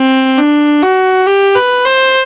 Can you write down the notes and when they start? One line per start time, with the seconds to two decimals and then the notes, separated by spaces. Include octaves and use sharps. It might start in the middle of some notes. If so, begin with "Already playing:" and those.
Already playing: C4
0.38 D4
0.82 F#4
1.27 G4
1.55 B4
1.85 C5